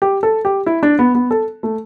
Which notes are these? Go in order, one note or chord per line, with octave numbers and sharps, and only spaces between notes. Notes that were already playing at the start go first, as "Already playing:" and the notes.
G4
A4
G4
E4
D4
B3
B3
A4
A3